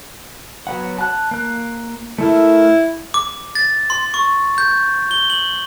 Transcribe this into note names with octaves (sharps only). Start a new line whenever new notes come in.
F#3 B3 F#5
A5 F#6
A#3 F#6
A3 E4 A4 A#4
D6
A6
C6
C#6
G6
G7
F#7